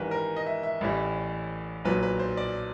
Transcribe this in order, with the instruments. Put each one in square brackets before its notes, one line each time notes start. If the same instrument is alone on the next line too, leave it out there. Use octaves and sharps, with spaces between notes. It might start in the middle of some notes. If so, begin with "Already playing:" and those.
Already playing: [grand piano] G#1 G2 E3 G3 A#4 B4
A#4
D#5
E5
E5
A1 A2 E3 G3
B1 A#2 F#3 B4
B4
C5
D5